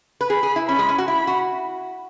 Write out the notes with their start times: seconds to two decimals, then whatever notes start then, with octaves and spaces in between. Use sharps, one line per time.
0.21 B4
0.30 G#4 B5
0.43 G#4
0.56 E4
0.68 C#4 B5
0.79 G#3
0.89 C#4
0.98 F#4
1.08 E4 B5
1.27 F#4